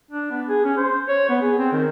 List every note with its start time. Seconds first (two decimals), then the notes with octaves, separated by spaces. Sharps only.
0.11 D4
0.31 B3
0.48 G#4
0.64 C#4
0.77 C5
1.08 C#5
1.29 B3
1.42 G#4
1.59 C4
1.72 D#3